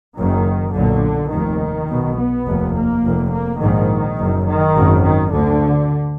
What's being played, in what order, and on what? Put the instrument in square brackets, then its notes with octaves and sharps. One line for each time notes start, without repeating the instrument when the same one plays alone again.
[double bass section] F#1 F#2 D#3
B1 A#2 D3
F1 D#2 D#3
B1 B2
B3
F1 D#2
A#3
F1 F2
A#3
A#1 G#2 D#3
F#1 F#2
D#3
G#1 F#2
D#3
D2 D3